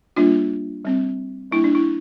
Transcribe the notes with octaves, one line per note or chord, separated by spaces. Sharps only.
G3 A#3 D4 F4
G3 C4
G3 A#3 D4 E4
D4
E4